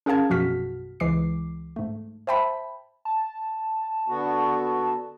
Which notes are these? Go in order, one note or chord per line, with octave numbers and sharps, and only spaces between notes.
C#4 G#4 A#4 F5 A5 G#6
A#1 F#2 B2 F#4 F6 B6
C#2 E3 G#3 D6 C7
G#2 A3
C5 E5 G5 A5 B5
A5
D3 B3 F#4